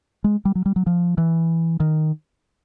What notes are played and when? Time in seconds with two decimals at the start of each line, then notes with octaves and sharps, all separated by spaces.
0.24 G#3
0.45 G3
0.55 F#3
0.66 G3
0.76 F#3
0.86 F3
1.18 E3
1.80 D#3